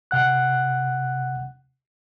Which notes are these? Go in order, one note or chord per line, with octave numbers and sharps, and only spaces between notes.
C3 F#5 F#6